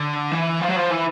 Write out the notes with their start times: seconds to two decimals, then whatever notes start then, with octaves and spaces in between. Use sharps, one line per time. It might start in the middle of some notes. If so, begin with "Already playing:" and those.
Already playing: D3
0.32 E3
0.61 F3
0.68 F#3
0.76 F3
0.90 E3